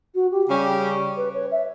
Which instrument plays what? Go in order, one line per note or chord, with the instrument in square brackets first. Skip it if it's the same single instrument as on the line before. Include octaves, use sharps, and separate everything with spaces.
[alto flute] F#4
G4
[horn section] C#3 G3 C#4 G4
[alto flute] B4
C#5
E5